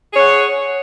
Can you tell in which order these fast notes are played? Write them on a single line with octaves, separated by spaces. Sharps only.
G#4 C#5 F#5